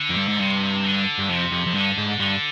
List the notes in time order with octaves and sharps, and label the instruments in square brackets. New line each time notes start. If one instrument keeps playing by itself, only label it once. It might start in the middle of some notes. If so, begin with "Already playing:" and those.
Already playing: [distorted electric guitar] D3
[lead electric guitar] F2
G2
G#2
[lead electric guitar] G2 [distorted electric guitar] C3
[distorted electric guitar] D3
[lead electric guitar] G2
[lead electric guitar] F2 [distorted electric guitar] C3
[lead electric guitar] F2
F2
[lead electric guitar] G2 [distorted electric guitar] D3
[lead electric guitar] G#2
[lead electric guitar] G2 [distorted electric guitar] D3